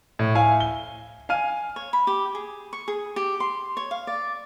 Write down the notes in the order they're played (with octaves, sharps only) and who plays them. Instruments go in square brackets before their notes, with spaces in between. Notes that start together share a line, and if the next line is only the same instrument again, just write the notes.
[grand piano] A2
E4 F5 G#5
G7
F5 G#5 F6 D#7
[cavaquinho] C#5
B5
G4
G#4
C#6
G#4
G4
C6
C#5
F5
D5